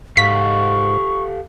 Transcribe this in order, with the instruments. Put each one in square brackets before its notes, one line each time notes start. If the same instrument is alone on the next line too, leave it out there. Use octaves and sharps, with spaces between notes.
[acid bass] G#2 [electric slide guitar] G4 A4 F5 [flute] C#6 [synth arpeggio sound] B6